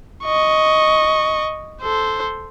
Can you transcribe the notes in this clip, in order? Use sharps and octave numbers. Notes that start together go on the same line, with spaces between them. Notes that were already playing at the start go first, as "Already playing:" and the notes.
D#5 C#6
A4 C5